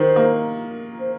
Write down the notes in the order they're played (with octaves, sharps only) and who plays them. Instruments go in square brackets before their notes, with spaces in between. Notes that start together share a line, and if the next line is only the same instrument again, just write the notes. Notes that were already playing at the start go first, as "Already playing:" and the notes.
Already playing: [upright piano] D#3 [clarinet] C5
[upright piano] A#3
[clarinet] C5